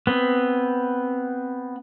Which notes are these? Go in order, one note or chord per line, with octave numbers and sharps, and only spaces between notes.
B3 C4